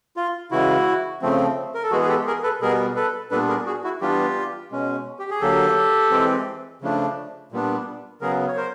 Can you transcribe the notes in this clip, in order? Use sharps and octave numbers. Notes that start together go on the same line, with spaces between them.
F4
C#3 E3 G#3 E4 F#4
C#3 F3 A3 C4
A#4
A4
E3 G#3 B3 F#4 G#4
G#4
G4 A4
G#4 A#4
A4 B4
B2 G3 B3 G#4 A#4
A4 B4
A#2 G3 B3 D4 A4 B4
G#4 A#4
F#4 G#4
E4 F#4
E3 G3 B3 D4 F4 G4
B2 G#3 C#4
G4
G#4
D3 F#3 A#3 G4 A4
E3 G#3 C4
C#3 F3 A3 D4
A#2 G3 B3 D4
C#3 F#3 B3 G#4 A#4
C#5
A#4 C5